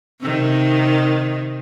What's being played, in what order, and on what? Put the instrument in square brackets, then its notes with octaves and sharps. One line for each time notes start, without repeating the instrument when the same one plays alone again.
[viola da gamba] C3 D#3